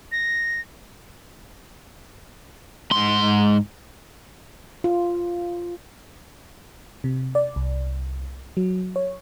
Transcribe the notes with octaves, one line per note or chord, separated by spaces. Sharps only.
A#6
G#2 C6
F4
C3
D5
C2
F#3
C#5